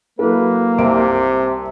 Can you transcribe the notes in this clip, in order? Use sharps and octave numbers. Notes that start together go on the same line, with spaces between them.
F#3 A#3 E4 A4 B4
C2 C3 E5 D7